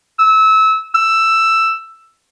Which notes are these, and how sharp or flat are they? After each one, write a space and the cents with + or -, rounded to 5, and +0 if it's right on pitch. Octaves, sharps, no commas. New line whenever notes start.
E6 -25
E6 +10